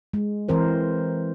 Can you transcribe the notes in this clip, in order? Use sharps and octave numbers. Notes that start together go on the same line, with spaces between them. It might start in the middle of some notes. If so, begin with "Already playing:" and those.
G#3
E3 C4 A#4 C5